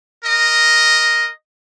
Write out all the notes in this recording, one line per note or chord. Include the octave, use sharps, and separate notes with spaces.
A#4 D#5